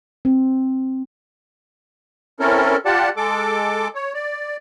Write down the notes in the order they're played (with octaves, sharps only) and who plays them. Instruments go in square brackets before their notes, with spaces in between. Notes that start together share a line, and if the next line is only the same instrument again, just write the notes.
[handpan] C4
[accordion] C4 C#4 E4 A4 A#4
F4 G4 D5 F#5 A5
G#3 A4 D6
C#5
D5